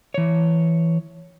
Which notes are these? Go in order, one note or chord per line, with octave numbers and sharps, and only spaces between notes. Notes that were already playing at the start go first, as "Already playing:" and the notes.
E3 C#5